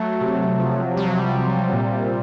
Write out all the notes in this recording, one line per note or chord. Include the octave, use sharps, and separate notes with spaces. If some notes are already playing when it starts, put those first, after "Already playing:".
Already playing: F#3 A3
C3
F3
C3 G3
F#3
G3
C3
A#2